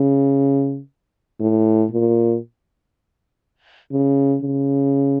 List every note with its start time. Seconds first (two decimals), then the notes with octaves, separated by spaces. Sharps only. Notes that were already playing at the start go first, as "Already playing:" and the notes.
Already playing: C#3
1.40 A2
1.91 A#2
3.92 C#3
4.42 C#3